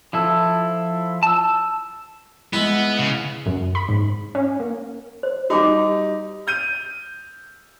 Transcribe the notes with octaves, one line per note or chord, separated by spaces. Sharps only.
F3 E4 A4
A5 E6
G#3 B3 E4
C#3
F#2
B5
G#2
C#4
A#3
C5
G3 D#4 F#4 G#5 D6
F6 G6 D#7